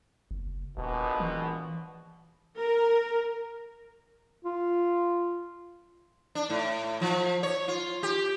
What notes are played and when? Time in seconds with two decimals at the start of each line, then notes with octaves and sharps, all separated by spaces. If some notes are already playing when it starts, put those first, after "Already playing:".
0.31 F#1
0.78 D#1 A#1 B2
1.20 E3
2.59 A#4
4.45 F4
6.35 D4
6.50 A2
7.01 F3
7.43 C#5
7.68 F4
8.03 G4